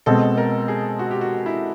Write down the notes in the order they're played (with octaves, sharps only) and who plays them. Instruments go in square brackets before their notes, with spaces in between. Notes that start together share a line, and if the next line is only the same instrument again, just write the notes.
[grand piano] B2 G#3 C4 [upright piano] A4
[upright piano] A#4
G#4
F#4
G4
F#4
E4